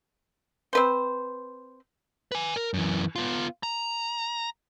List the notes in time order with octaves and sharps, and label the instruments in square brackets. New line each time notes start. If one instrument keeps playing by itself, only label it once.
[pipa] C4 B4 C5
[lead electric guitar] B4 G#5
A#4
F#2 E3
B3 F4
A#5